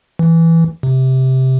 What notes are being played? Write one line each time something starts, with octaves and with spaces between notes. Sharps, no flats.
E3
C3